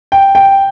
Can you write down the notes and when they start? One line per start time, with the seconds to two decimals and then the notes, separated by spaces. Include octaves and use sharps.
0.12 G5
0.35 G5